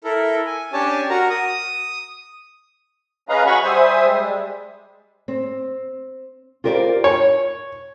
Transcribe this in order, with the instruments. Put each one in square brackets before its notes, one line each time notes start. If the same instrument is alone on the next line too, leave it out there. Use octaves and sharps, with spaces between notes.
[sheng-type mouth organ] E4 A4 A#4
G#5
C#4 D4 G4 C#5 G#5 A5
F#4 A#4 A#5
D#6
[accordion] C#4 G#4 B4 D#5 F5 A#5
F#4 F#5 G#5 B5 C#6
G3 C5 E5 G#5 D#6
G3 G#3
[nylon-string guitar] C4
F4 G4 A#4 C5 D5
[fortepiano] C#5